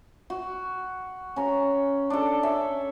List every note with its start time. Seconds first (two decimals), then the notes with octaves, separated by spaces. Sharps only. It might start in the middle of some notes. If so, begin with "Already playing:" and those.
0.30 F#4
1.36 C#4 A#5
2.10 D4 A4
2.43 C#4 E5